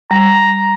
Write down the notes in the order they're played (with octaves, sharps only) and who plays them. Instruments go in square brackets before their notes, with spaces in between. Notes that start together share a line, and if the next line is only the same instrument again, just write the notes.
[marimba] G3 [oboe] A#5